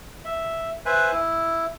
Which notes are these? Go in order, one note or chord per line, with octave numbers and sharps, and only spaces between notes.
E5
B4 C5 E5 G#5 F#6
E4